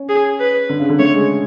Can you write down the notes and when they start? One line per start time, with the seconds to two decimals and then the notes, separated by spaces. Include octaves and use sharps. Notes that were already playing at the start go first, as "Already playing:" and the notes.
Already playing: C#4
0.09 G#4
0.40 B4
0.69 D3
0.79 C#3
0.89 D3
0.99 A3 C#5
1.14 G#3